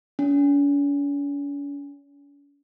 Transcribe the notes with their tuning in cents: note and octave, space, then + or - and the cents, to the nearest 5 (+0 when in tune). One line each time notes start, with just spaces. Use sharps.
C#4 +45